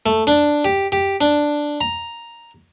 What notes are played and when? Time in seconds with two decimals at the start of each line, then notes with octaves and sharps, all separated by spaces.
0.06 A3
0.27 D4
0.65 G4
0.92 G4
1.21 D4
1.81 A#5